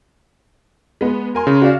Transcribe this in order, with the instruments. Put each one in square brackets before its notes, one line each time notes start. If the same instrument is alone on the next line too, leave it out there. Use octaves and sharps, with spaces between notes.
[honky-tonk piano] G#3 B3
A#4 G#5 C6
[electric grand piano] C#3
[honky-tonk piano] F#4 D5 F5